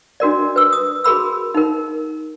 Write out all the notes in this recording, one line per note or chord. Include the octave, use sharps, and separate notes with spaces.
D4 F#4 A#4 D5
B4 E6
D#6
F#4 G#4 A#4 B5 E6
D#4 A#4